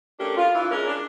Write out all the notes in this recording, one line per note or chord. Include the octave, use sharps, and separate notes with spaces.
A3 C#4 D4 G4 A#4
F4
D4 E4 F4
G#3 C#4 A#4
D4